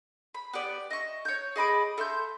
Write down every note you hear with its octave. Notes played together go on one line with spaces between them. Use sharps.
B5
B3 G4 D5
D#5 E5 C#6
C#5 G6
G#4 D#5 B5 D6
A4 E5 C6 G6